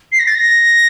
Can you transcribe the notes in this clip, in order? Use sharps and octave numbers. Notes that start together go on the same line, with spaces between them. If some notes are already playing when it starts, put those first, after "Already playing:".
C7
A#6
A6
A#6